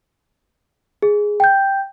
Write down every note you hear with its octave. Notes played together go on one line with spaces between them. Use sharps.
G#4
G5 G6